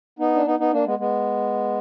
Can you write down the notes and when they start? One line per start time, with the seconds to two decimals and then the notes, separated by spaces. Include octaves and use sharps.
0.19 B3 D#4
0.35 D4
0.46 B3 D#4
0.59 B3 D#4
0.72 A#3 D4
0.86 G#3 B3
0.99 G#3 B3